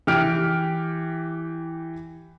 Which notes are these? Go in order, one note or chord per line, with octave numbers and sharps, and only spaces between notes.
E3 G4 F6 D7